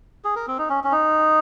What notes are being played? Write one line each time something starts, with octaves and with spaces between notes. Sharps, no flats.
G#4
A#4
C4
D#4
C#4
C#4
D#4